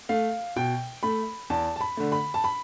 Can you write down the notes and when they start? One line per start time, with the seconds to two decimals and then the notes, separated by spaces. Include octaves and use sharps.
0.09 A3 F5
0.56 B2 G5
1.03 A3 B5
1.50 E2 A5
1.76 A5
1.81 B5
1.97 D3 A3
2.12 B5
2.34 A5
2.44 B5